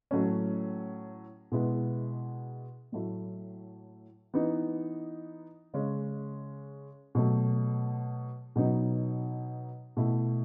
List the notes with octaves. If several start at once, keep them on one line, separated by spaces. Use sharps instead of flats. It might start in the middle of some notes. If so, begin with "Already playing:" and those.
A2 F#3 A3 C#4
B2 G#3 B3 E4
A2 F#3 A3 E4
E3 B3 D#4
C#3 G#3 C#4
B2 F#3 A3
B2 F#3 B3 D#4
B2 A3 E4